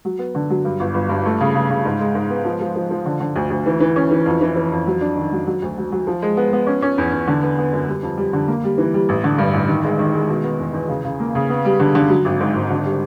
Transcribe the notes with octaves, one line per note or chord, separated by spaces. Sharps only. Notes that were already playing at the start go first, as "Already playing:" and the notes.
F#3
B3
D3
F#3
G2
G1
G1
G2
A3
C#3
C#3
C#3
G#2
G#3
G#2
B3
F3
F3
F3
F3
D3
D3
D2
D2
E3
E3
C#4
E3
F2
E3
E3
F2
F#3
D4
D#3
F#3
F#3
D2
F#3
F#3
F3
G#3
B3
B3
C#4
C#4
E2
E2
D3
B3
B3
F#2
G3
F2
G3
D3
A#3
G3
E3
G3
A1
D3
G2
A1
D#3
G#3
D#3
G#3
B2
B3
E2
E2
C#3
C#3
A#3
C#3
B3
G3
D3
D3
F#3
G#1
G#2
G#1
D3
G3